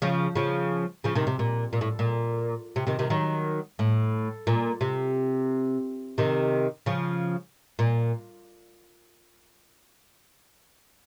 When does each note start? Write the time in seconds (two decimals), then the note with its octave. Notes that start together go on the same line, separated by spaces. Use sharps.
0.02 C#3 F3
0.35 C#3 F3
1.04 C#3 F3
1.15 C3 D#3
1.27 C3
1.39 A#2
1.73 A#2
1.81 A2
1.99 A#2
2.76 C3
2.87 C3 D#3
2.99 C3 D#3
3.10 D#3 F#3
3.79 A2
4.47 A#2
4.81 C3
6.18 C3 D#3
6.86 C#3 F3
7.79 A#2